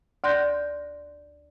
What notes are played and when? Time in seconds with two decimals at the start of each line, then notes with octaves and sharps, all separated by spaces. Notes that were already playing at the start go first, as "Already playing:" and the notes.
0.24 D2 D5 C6 F#6 G6 A#6